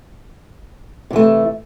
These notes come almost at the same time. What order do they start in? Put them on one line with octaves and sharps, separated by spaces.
C3 E3 A3